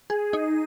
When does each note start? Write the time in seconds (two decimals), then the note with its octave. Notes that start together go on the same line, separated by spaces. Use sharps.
0.10 G#4
0.33 D#4